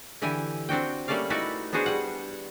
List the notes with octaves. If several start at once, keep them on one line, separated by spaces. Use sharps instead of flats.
D3 E3 E4 G4 G#5
C4 D4 F#4 G5
G3 A3 A#3 C#4 D5 F5
D#4 E4 F#4 B4 D5 E5
B3 D4 F#4 G#4 C5
G3 F#5